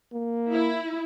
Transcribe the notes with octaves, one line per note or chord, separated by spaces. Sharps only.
A#3
E4